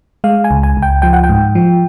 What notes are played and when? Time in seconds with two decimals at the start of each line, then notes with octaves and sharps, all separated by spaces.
0.24 G#3 F5
0.44 G#5
0.51 C#2
0.63 G#5
0.77 C#2
0.82 G5
1.02 F3 G5
1.13 F#5
1.24 G5
1.29 G#2
1.55 F3